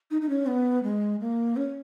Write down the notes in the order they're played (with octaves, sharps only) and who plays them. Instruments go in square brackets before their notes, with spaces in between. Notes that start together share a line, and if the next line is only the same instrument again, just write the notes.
[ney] D#4
D#4
C#4
B3
G#3
A#3
C#4